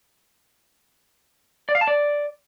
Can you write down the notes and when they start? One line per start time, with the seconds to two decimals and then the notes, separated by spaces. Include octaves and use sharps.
1.69 D5
1.75 F5
1.81 A5
1.87 D5